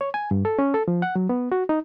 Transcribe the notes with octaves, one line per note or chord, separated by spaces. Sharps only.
C#5
G#5
G2
A4
C#4
A4
F3
F#5
F#3
B3
F#4
D#4